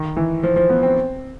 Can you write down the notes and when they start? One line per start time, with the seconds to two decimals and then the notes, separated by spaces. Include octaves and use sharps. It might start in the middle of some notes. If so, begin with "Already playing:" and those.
Already playing: D#3
0.17 E3
0.43 F3
0.56 F3
0.70 B3
0.83 C4